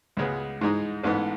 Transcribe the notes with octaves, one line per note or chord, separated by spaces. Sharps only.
C#2 C#3 G#3 B3
G#2 E3 G#3 D#4
A1 G#2 E3 B3